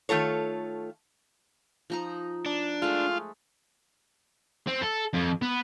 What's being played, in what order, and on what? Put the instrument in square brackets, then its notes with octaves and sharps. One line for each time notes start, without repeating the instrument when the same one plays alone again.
[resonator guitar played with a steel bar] D#3 A3 F4 A4 C#5
[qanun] F3 D#4 A#5
[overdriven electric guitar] D4
[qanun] G#3 A3 [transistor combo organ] F4
[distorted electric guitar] C4
A4
F2
B3